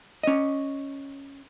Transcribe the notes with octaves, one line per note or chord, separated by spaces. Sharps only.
C#4 D#5